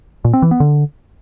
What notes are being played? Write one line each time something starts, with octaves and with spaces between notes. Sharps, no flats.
A#2
C4
E3
B3
D3